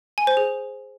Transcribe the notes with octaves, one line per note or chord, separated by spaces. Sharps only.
G#5
C5
G#4